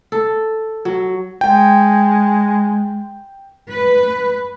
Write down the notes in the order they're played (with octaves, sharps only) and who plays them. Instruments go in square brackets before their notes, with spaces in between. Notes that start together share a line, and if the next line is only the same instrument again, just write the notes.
[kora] A4
F#3
[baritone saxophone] G#3 [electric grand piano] G5
[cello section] B4